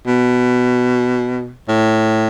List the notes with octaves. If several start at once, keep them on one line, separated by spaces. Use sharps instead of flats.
B2
A2